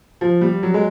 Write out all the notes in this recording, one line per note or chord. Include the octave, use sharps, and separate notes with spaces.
F3
G3
F#3
G#3